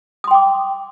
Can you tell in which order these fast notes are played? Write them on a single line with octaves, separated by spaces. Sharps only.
D#6 C6 G5 D6